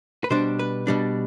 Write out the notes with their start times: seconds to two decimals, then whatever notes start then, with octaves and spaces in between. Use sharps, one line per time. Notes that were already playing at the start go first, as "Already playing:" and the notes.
0.24 B4
0.30 B2 G3 D4 C5
0.59 B4
0.87 B2 G3 D4